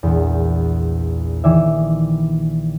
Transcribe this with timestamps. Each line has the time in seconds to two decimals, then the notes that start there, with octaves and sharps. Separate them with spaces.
0.03 A#1 E2
1.44 D#3 E3 D5 E5